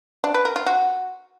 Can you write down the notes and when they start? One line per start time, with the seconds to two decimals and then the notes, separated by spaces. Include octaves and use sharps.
0.24 D4
0.34 B4
0.45 A#4
0.56 F4
0.66 F#4